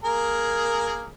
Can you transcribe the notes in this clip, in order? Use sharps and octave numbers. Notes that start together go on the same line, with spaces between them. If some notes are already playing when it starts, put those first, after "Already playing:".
A#3 G#4 A#4